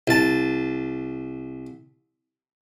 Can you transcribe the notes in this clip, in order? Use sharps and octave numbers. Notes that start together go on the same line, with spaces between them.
C2 A5